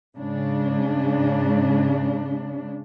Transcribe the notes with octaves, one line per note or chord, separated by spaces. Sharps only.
G#2 C#3 G#3 D4